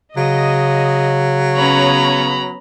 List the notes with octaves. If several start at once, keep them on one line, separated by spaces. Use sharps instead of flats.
C#3 F#3 D#5
B3 C#4 C#5 A#5 B5